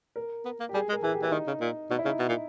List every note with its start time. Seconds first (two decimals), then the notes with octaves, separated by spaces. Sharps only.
0.16 A#4
0.45 B3
0.60 A#3
0.69 G4
0.74 G3 G#4
0.89 G#3
0.92 A#4
1.03 E3 G#4
1.12 G4
1.22 E3 E4
1.32 D#3 D#4
1.47 C#3
1.61 A#2
1.90 B2 D#4
1.99 E4
2.05 C#3 D#4
2.19 B2
2.29 A#2